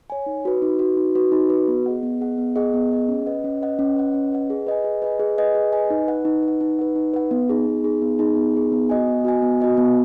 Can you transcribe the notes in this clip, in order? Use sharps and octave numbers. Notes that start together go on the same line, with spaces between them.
C#5 G#5
D#4
F#4 B4
D#4
F#4 B4
D#4
F#4 B4
D#4
F#4 B4
B3
G#4 D#5 F#5
B3
G#4 D#5 F#5
B3
G#4 D#5 F#5
B3
G#4 D#5 F#5
C#4
B4 D#5 F#5
C#4
B4 D#5 F#5
C#4
B4 D#5 F#5
C#4
B4 D#5 F#5
G#4
B4 D#5 G#5
G#4
B4 D#5 G#5
G#4
B4 D#5 G#5
G#4
B4 D#5 G#5
D#4
B4 F#5
D#4
B4
F#5
D#4
B4 F#5
D#4
B4 F#5
B3
D#4 G#4
B3
D#4 G#4
B3
D#4 G#4
B3
D#4 G#4
B3
F#4 D#5 G#5
B3
F#4 D#5 G#5
B3
F#4 D#5 G#5
B3